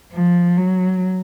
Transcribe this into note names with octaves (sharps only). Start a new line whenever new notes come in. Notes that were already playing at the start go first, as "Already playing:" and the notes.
F3
F#3